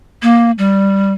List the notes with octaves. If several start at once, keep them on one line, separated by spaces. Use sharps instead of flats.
A#3
G3